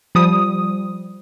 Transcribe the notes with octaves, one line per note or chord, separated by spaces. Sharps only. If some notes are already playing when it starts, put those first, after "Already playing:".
F3 G3 D#6